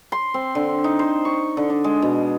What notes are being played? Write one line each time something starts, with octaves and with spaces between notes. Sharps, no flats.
C6
C4
D3
D#4
C5
C#6
D3
D4
G#3
B2